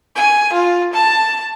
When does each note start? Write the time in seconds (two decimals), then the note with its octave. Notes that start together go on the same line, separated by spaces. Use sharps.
0.16 G#5
0.53 F4
0.93 A5